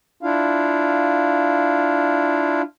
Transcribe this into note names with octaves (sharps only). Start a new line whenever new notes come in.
D4 E4 F4 F5